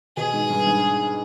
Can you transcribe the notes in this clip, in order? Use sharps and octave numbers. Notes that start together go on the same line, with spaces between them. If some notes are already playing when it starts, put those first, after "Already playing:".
B2 G#4
G#2
G2
G#2